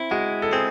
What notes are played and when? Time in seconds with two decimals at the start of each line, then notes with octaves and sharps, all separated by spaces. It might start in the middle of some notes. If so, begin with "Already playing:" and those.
Already playing: C4 E4
0.11 G#3 F#4
0.42 A4
0.52 C4 G#4